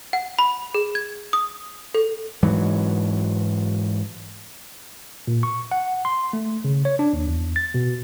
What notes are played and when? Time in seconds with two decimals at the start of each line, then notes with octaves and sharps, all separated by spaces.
0.13 F#5
0.39 B5
0.75 G#4
0.95 G#6
1.33 D#6
1.94 A4
2.43 G#2 E3 F#3
5.27 A#2
5.43 C#6
5.72 F#5
6.05 C6
6.33 A3
6.64 C#3
6.85 C#5
6.99 D4
7.13 D#2
7.28 E2
7.56 A6
7.74 B2